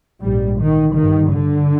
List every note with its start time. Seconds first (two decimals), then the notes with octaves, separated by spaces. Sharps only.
0.22 A#1 G#2 G3
0.58 D#3
0.95 G1 G2 D#3
1.31 D3